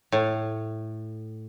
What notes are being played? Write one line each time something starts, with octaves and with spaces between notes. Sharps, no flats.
A2